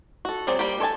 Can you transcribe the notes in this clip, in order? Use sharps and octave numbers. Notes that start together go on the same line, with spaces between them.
F#4 A4
F#3 C4 G#4 D5
G3 A#3 G4
A4 C#5 D5 G#5 A5